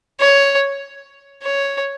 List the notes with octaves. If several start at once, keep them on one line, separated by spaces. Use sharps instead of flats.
C#5
C#5